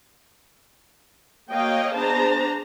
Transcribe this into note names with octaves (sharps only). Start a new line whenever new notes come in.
A#3 F#4 C#5 D#5 F5 G5
B3 D4 G#4 C5 A5 A#5